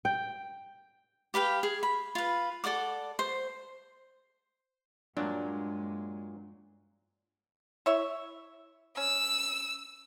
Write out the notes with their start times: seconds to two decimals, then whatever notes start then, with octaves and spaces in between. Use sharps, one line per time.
0.05 G5
1.34 G4 B4 F5 G5
1.63 G#4
1.83 B5
2.15 F4 B4
2.64 A4 D5 F#5 D6
3.19 C5
5.17 G2 A#2 F#3 G#3 D4
7.86 E4 C#5 E5
8.97 C#4 E6